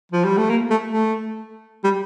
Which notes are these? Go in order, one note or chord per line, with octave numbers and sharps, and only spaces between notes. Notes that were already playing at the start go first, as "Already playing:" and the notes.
F3
G3
A3
A#3
A3
A3
G3